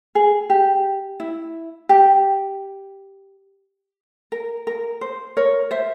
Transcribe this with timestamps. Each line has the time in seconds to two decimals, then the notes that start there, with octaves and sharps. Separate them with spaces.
0.15 G#4
0.50 G4
1.20 E4
1.89 G4
4.32 A#4
4.67 A#4
5.01 C5
5.37 A#4 C#5
5.71 C5 E5